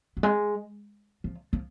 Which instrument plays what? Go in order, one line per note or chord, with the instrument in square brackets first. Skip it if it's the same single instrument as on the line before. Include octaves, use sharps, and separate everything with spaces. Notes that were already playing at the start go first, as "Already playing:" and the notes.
[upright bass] F#3
G#3
F3
F3